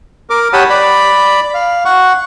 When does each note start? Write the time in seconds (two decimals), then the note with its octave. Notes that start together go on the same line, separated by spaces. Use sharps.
0.30 A#4 D6
0.53 G4 C#5 F#5 A5 B5 D#6
0.70 D5 B5
1.54 F5
1.85 F#5 C#6